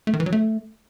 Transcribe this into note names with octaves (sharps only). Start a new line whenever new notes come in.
A3
D#3
E3
F#3
A3